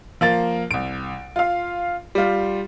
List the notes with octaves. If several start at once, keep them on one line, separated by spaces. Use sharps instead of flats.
F3 A#3 A6
C2 D7
F4 F5
G3 F4